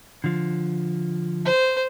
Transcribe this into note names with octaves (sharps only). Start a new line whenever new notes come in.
D3 F3
C5